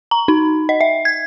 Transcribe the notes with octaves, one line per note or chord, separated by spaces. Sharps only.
A#5
D#4
D#5
E5
G#6